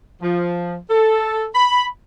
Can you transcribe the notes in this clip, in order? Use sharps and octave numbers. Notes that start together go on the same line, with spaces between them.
F3
A4
B5